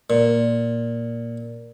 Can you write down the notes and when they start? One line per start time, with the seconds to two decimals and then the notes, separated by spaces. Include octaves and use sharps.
0.10 A#2